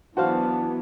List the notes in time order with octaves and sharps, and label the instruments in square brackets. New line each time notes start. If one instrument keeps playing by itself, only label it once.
[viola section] E3 F#3 B3 [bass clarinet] D4 [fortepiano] F#4 C5 F5